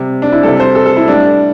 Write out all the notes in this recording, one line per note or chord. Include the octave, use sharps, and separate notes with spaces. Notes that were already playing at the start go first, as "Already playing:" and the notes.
Already playing: C3 G3
D4
E4
C3 G3 A4
C5
A4
A4
E4
A2 G3 D4